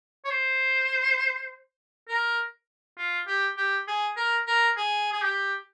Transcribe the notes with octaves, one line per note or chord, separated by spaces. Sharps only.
C#5
C5
A#4
F4
G4
G4
G#4
A#4
A#4
G#4
G#4
G4